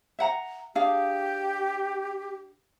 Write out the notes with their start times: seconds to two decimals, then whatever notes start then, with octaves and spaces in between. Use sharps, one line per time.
0.19 E5 F#5 A#5
0.75 D4 G4 G#4 F5